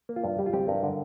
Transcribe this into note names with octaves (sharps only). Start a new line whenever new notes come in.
A#3
F4
G2
G3 G4
F4
C4 G4
G2 A#4
D3